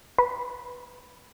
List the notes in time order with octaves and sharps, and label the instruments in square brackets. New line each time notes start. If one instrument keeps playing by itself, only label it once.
[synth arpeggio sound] B4